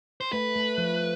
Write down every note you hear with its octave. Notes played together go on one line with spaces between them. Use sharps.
C5
A3 B4
A3
F3